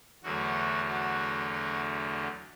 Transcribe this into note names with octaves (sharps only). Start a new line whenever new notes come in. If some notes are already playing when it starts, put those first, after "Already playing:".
E2 D3 F#3 A3 F#4
F#4
F#4